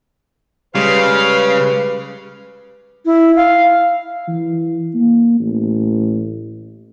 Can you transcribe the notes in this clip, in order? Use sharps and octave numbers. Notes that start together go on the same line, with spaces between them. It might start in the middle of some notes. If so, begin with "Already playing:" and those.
C#3 G3 G#3 B4 F5
E4
F5
E3
A#3
A1